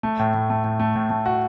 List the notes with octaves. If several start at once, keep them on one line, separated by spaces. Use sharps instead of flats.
A3
A2
A2
A3
A2
A3
A2
A3
F#4